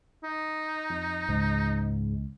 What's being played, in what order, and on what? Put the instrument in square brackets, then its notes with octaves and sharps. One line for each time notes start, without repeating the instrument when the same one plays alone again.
[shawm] D#4
[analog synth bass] F2
[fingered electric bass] C#2 [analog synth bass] G#2